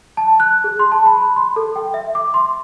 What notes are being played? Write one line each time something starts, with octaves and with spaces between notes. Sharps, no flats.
A5
F#6
G#4
C6
A5
B5
C6
A4
G5
E5
D6
C6